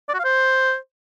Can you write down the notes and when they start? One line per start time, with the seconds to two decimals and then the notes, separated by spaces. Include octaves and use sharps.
0.09 D5
0.14 F#4
0.19 F5
0.24 C5